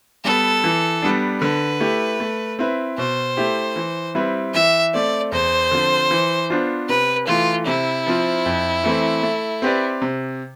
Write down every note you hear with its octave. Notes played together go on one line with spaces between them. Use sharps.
G3 B3 A4
E3
G3 B3 D4
D3 B4
A3 E4 G4
A3
C4 E4 B4
B2 C5
A3 E4 G4
E3
G3 C4 E4 B4
E3 E5
A3 C4 D5
E2 C5
D3 F3 C4 F4
E3
B3 D4 F4 C5
C3 B4
E3 A3 F4
C3 E4
F3 C4 F4
F2
E3 A3 C4
A3
C4 G4 B4 D5
C3